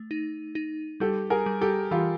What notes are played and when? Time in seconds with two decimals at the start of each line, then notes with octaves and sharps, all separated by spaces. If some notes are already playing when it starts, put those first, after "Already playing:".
Already playing: A3
0.11 D#4
0.55 D#4
1.00 G3 G4 A4
1.30 G#4 A#4
1.46 G3
1.61 G4 A4
1.91 E3 F4 G4